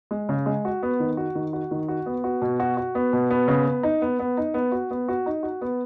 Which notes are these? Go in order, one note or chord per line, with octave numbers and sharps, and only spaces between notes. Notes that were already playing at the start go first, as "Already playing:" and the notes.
G#3
C#3
G#3
F#4
B3
D#3
F#4
D#3
F#4
D#3
F#4
B3
F#4
B2
F#4
F#4
B3
B2
B3
C#3
B3
D#4
B3
B3
D#4
B3
F#4
B3
F#4
D#4
F#4
B3